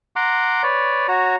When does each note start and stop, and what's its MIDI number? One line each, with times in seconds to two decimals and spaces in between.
0.16 0.62 78
0.16 0.62 82
0.16 0.62 84
0.16 0.62 86
0.63 1.07 71
0.63 1.07 73
0.63 1.07 74
1.08 1.36 66
1.08 1.36 73
1.08 1.36 82